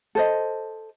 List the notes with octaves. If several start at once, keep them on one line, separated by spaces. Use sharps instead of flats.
A4 C5 D#5